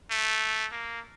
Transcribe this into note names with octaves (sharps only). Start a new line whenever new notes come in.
A3
A#3